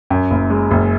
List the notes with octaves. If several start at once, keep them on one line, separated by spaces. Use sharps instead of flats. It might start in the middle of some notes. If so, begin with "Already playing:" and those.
F#2
F#1
G#3
F#1